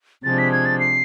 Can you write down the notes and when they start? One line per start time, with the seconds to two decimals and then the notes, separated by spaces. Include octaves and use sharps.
0.24 C3 F3 G#3 D4 A6
0.38 B6
0.52 G#6
0.65 A6
0.80 C7